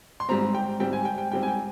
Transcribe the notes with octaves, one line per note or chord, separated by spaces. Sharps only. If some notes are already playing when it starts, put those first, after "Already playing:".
C6
G#2 G3 C4 A#5
G5
G#2 G3 C4 G5
G#5
G5
G5
G#2 G3 C4 G5
G#5
G5